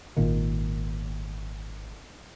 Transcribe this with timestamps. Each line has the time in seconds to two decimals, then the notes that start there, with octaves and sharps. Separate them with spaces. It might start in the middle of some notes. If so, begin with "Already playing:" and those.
0.16 G#1 A#2 D#3